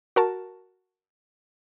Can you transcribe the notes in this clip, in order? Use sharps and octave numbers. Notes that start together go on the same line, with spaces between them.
F#4 A#4 A5